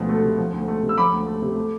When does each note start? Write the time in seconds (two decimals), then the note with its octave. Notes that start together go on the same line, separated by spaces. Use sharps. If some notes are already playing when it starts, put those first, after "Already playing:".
Already playing: D2 B2 F3
0.09 A3
0.23 C3
0.38 F3
0.53 D2
0.68 A3
0.82 C3
0.89 E6
0.97 F3 B5 D6
1.12 D2
1.27 A3
1.42 C3
1.56 A3